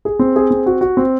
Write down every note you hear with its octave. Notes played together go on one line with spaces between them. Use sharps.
G#4
C4
G#4
C4
F#4
F#4
C4